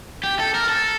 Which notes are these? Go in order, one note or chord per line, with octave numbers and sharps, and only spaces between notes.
G4
A4
A#4
A4